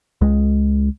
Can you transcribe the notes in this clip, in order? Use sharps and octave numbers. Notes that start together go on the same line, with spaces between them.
C#2 G#3